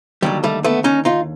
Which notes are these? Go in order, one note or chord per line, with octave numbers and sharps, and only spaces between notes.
D#2 D3 F#3 G3
G3 A3
A3 B3
C#4 D#4
D#4 F4